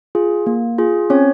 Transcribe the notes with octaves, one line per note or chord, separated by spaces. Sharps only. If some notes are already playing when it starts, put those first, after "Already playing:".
F4 G#4
A#3
F4 G#4
C4 C#4 C#5